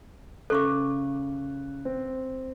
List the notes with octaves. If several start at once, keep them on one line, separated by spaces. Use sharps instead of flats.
C#3 A4 C#6 D6 F#6
C4